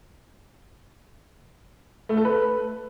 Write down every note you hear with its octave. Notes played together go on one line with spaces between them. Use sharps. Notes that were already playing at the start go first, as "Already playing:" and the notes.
A3
A4
B4